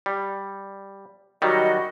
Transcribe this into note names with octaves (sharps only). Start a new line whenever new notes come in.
G3
D#3 F#3 G3 F#4 D#5